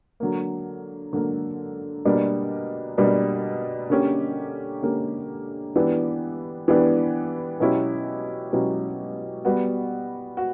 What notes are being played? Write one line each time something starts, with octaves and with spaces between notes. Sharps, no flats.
D3 F#3 A#3
D3 F#3 A#3
B2 G3 A#3 D4
B2 G3 A#3 D4
D3 A#3 C#4 G4
D3 A#3 C#4 G4
E3 B3 D4 G4
E3 B3 D4 G4
B2 F#3 C#4 E4 G4
B2 F#3 C#4 E4 G4
G3 B3 F#4
F#4